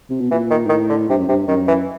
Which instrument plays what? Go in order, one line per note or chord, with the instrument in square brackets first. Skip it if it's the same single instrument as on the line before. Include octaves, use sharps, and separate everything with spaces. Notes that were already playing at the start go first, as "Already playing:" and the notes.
[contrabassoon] C3
B2
[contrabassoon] A#2 [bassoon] E3
[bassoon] D#3
[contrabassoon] G#2
[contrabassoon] A2 [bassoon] D#3
[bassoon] D3
[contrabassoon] G2 [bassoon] C3
[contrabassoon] F#2
[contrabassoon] G2 [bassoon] C3
[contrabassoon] F#2 [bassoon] D#3
[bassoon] E3